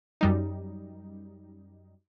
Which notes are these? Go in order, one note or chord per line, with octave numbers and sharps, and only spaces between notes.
F#2 G3 D#4